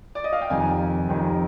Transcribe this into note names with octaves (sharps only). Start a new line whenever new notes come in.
D5
D#5
F5
G5
F2 C3 D#3 G#5
F2 C3 D#3